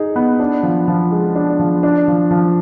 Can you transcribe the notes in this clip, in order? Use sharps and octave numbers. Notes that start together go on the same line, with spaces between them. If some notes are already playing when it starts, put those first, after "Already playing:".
Already playing: D#4 G#4
B3
D4
F3
F3
G#3
D4
F3
D4
F3
F3